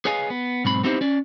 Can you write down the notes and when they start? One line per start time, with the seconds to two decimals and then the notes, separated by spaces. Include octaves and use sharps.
0.05 G#4 B4 C#5 D#5 F5 G#5
0.30 B3
0.65 B1 G#2 C4 B5
0.83 B3 C4 D#4 E4 G4 C5
1.01 C#4 D5